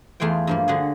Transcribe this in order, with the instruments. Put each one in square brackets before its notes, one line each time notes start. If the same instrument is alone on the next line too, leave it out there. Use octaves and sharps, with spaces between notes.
[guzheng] E2 A3 F4 G#4 G5
G2 F3 A#3
D3 F#4 G#4